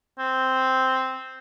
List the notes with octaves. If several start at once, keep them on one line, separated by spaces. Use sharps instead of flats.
C4